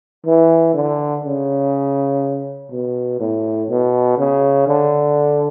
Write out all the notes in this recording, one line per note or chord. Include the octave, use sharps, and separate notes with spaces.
E3
D3
C#3
B2
A2
B2
C#3
D3